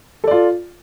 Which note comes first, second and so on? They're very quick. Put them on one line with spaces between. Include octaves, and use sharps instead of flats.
A4 D5 F4